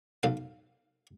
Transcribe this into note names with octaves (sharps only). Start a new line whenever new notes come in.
B1 F5